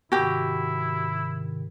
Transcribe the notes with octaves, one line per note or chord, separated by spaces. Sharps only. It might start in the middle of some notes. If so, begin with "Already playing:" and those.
G#2 C3 D#3 E4 F#4 G4